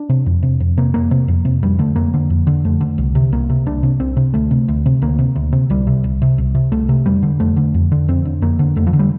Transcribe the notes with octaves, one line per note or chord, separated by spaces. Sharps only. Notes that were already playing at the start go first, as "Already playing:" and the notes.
Already playing: D4
C3
F2
C3
F2
C3 A#3
F2 A#3
C3
F2
C3
F2 G3
D3 A3
F2 A#3
D3
F2
D3
F2 A3
D3
C2
C3
C2 A#3
C3
C2 D4
C3
C2 C4
C3
D2 A3
C3
D2
C3
D2 A#3
C3
D2
C3
C2 G3
C3
C2
C3
C2
C3
C2 A3
C3
F2 G3
D3
F2 A3
D3
F2
D3
F2 C4
D3
F2 A#3
D3
F2 A3
F3
D3
G3